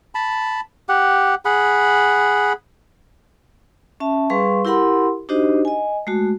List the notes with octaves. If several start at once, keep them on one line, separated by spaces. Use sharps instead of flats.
A5 B5
G4 F#5
G#4 F#5 B5
C#4 E5 A5
G3 G#4 B4 F5 C6 C#6
E4 G4 A#4 F#5 B5 C6
D4 D#4 F#4 G4 C5 D#5
D#5 G#5
G#3 A3 F#4